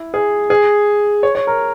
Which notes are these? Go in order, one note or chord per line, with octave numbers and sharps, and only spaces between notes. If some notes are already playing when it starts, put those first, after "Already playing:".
Already playing: E4
G#4
G#4
C#5
C#5
A#4